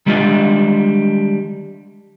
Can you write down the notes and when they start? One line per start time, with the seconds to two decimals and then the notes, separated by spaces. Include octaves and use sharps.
0.06 D#3 G3 G#3 D4 F4 D#5